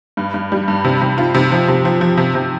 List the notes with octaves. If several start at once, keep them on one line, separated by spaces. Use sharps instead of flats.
G2
G2
G3
G2
C3
C3
F4
C3
F3
C3
F3
F3
C3
C3